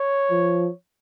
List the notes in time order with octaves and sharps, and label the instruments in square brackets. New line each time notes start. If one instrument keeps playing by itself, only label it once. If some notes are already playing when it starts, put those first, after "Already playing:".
Already playing: [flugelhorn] C#5
[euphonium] F3